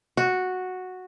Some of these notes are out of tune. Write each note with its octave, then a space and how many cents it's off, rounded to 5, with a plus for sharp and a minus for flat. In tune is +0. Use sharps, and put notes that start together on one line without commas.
F#4 -5